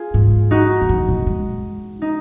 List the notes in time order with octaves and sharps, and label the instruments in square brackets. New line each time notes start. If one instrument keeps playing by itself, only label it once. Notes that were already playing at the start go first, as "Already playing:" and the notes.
Already playing: [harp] F4 G#4
[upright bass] G#2
[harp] D#4 F#4
[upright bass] F2
F#2
A#2
G#3
[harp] D#4